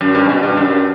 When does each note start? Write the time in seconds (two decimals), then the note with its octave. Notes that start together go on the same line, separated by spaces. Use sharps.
0.01 F#2
0.15 G2
0.29 B2
0.43 G2
0.57 F#2